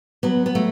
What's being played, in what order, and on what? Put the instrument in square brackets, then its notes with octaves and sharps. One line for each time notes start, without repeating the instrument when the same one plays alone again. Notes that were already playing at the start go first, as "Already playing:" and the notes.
[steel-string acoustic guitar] F#3 B3
B3
F#3 A3